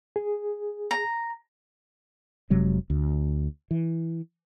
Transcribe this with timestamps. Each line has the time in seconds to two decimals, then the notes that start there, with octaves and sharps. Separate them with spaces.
0.16 G#4
0.91 A#5
2.50 F1 C3 F#3 G#3
2.90 D2
3.71 E3